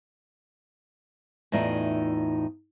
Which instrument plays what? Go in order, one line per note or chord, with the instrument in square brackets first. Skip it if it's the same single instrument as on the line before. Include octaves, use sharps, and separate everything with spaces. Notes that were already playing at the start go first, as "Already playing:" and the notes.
[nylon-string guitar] E2 A2 D#4 F4 D5 E5